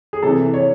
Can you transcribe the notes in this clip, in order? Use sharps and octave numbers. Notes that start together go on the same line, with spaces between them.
G#4
C3 E3 A4
C#5